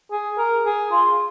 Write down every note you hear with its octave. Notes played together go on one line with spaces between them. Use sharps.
G#4
A#4
G#4
F4